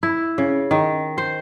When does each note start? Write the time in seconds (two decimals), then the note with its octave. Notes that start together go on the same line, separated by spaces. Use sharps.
0.03 E4
0.38 C#3
0.71 D#3
1.18 C5